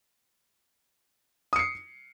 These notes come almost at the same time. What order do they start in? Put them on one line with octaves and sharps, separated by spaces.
D#6 C#7 C7